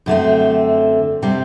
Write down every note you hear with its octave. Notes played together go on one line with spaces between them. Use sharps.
F#2 D3 A3 C4
C3 G3 C4